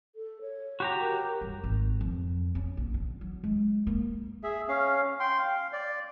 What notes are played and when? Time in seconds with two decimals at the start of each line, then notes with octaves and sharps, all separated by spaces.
0.16 A4
0.41 C#5
0.80 F#4 G4 A#5
1.01 A#4
1.41 G2
1.64 G#1
2.01 F2
2.55 C#4
2.77 A#1
2.94 D3
3.21 F#3
3.44 G#3
3.87 A#3
4.43 G#4 E5
4.68 C#4 F5
5.20 G5 C6
5.39 F5
5.73 D5